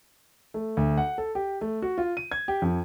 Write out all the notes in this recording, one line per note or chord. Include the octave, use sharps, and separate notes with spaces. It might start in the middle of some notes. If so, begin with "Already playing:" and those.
A3
D2
F#5
A4
G4
A3
F#4
F4
D#7
G#6
G4
F2